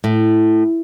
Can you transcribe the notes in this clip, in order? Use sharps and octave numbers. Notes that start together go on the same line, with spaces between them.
A2